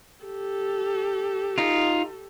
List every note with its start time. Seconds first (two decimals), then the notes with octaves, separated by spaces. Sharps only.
0.24 G4 A4
1.58 D#4 F4